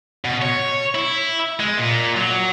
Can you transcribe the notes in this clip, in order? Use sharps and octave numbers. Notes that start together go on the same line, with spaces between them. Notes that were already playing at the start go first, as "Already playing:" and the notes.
B2
C#5
E4
G#3
A#2
F#3